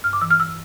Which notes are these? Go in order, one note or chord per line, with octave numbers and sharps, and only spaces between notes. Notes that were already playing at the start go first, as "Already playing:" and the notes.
G2 F6
D6
E3 E6
F6
E6